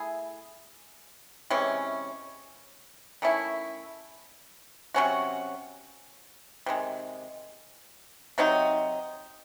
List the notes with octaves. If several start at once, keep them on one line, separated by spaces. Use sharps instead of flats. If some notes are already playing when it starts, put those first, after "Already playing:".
Already playing: A3 E4 G#4
C3 E3 G#3 C#4
D#3 A3 C#4 E4
C3 F#3 C#4 F#4
C3 D#3 G#3
C3 F#3 C4 D#4